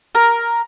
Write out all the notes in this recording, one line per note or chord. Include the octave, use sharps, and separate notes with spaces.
A#4